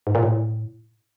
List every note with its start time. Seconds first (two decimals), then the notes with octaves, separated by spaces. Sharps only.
0.07 G#2
0.15 A#2
0.23 A2